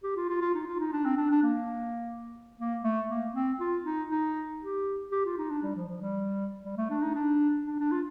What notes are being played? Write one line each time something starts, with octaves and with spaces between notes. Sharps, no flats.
G4
F4
F4
F4
D#4
F4
D#4
D4
C4
D4
D4
A#3
A#3
A3
A#3
C4
F4
D#4
D#4
G4
G4
F4
D#4
D4
G3
F3
F3
G3
G3
A3
D4
D#4
D4
D4
D4
F4